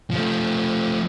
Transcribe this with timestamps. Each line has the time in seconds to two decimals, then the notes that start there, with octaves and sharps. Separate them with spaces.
0.11 F3 A3